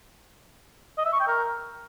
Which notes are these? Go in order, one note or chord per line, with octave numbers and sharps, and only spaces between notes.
D#5
E5
C#6
G5
A#4